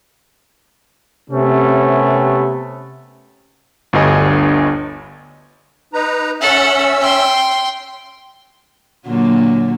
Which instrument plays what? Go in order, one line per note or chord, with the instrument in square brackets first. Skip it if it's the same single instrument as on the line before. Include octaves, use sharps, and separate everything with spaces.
[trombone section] C3 [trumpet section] A3 B3 C#4
[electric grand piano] G1 D2 G2 D3 D#5 G#5
[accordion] D#4 B4 A#5
[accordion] C#4 E5 E6 [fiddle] A4 F#5
[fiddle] G5 C6
[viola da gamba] A#2 D3 F#3